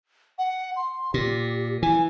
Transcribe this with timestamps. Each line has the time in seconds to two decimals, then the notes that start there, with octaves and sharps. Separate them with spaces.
0.38 F#5
0.76 C6
1.14 A#2 G4
1.83 E3 G#5